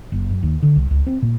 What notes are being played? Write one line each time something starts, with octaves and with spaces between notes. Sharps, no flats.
F#1
F#2
D#2
D3
C2
C#2
C4
A#2